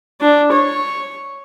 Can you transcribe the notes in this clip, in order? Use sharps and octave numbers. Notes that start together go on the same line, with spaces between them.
D4
C#5